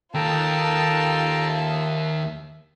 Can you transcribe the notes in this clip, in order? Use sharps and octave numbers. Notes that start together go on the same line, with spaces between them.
D#2 F4 A4 G5 A5 A#5
E5